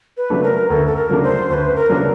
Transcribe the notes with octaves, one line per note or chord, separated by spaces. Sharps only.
B4
C#3 F#3 A3 D4
A#4
D2 A4
A4
A#4
C#3 F#3 A3 D4
C5
D2 B4 C5
A#4
C#3 F#3 A3 D4